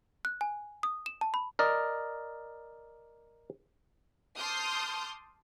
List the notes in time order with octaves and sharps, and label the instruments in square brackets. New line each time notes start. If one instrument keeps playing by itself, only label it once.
[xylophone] F#6
G#5
D#6
E7
A5
B5
[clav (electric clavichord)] A#4 D5 D#5
[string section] A5 C6 D6 D#6 F6 G6